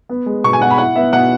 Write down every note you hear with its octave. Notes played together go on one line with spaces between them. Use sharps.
B3
G#3
B2 C#6
G#5
B2 F#5
B5
E4 F#5
B3 E5
B2 F#5